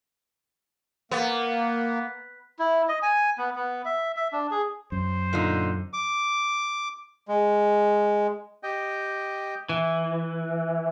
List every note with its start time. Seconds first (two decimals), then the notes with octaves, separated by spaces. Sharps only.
1.11 A#3 B3
2.59 E4
2.89 D#5
3.02 G#5
3.38 B3
3.56 B3
3.85 E5
4.17 E5
4.33 D4
4.51 G#4
4.92 F#2 C5
5.33 A#2 D3 D#4
5.93 D6
7.28 G#3
8.63 G4 D#5 G5
9.69 E3